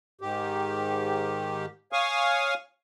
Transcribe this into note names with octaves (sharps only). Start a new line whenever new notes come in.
G#2 D#3 G4
C#5 F5 G#5 C#6 D#6 F6